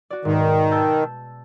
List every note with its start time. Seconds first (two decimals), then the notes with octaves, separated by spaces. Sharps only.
0.10 F#4 D5
0.25 G#2 B2 D#3
0.72 A5 E6 G6